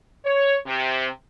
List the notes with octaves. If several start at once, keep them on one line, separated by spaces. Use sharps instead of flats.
C#5
C3